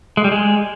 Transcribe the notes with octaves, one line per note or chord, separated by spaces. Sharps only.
G#3
G3
G#3